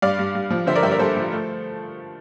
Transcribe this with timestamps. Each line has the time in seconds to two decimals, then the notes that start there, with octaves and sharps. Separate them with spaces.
0.02 G2 D5 F5
0.19 G2
0.35 G2
0.50 F3
0.67 D3 C5 E5
0.75 A#4 D5
0.83 G2 C5 E5
0.91 A#4 D5
0.99 G2 A4 C5
1.17 F3
1.32 A3